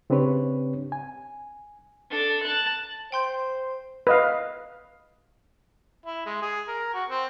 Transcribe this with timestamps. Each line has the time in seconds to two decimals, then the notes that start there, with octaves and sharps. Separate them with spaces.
0.10 C#3 C4 D4 G4 B4 C#5
0.92 G#5
2.10 D4 A4
2.43 A5 F#6
3.12 C5 G5 C6 G6
4.07 B4 D#5 F5
6.06 E4
6.26 G#3
6.42 G#4
6.68 A#4
6.94 F#4
7.09 C4